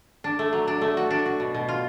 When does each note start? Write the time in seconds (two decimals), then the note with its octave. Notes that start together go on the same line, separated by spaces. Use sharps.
0.24 D4
0.39 A3
0.53 F#3
0.68 D4
0.81 A3
0.97 F#4
1.10 D4
1.26 F#4
1.40 B2
1.54 B2
1.69 F4